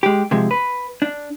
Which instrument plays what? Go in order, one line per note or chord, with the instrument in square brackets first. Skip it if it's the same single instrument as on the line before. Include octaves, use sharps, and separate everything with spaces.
[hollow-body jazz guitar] G#3 G4
C3 F3 G#3
B4
D4